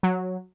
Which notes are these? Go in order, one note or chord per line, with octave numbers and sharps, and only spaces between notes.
F#3